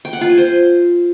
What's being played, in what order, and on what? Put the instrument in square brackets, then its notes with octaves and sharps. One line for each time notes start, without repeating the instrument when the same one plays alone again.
[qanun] G5
F#5
F4
G#5
C5